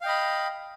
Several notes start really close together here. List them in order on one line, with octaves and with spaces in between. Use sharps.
F5 G5 D#5 B5